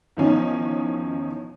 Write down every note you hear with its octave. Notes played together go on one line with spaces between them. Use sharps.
E2 B2 D#3 F3 C#4 D#4